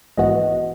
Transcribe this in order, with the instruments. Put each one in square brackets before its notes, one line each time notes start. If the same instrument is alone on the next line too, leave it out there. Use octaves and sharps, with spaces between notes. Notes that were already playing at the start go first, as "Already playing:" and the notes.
[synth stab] A#1 G#2 E3 B3 F#4 [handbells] D#5